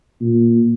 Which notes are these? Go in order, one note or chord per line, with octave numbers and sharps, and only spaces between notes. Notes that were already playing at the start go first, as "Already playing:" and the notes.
A#2